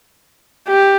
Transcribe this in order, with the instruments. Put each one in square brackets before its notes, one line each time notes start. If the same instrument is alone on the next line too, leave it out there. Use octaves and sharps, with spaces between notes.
[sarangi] G4